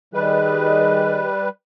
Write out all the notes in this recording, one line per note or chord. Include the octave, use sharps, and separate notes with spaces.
D#3 G3 G#4 B4 D#5